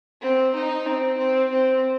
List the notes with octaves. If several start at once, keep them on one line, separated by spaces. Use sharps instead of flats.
C4
D#4
C4
C4
C4